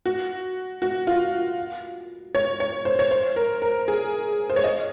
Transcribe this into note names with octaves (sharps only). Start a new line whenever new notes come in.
F#4
F#4
F4
C#5
C#5
C5
C#5
C5
A#4
A#4
G#4
C5
C#5
D#5